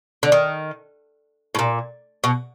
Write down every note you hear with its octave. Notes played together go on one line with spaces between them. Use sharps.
D3
D#3
A2
A#2
B2